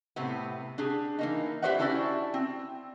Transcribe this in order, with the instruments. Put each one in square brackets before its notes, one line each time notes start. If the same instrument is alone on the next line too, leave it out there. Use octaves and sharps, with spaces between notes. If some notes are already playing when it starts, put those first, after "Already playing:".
[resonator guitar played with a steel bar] A2 C3 B3
D4 G4 G#4
E3 A#3 D#4
G4 B4 C5 D5 E5 F#5
C#4 D4 E4 F#4 G4 D5
C4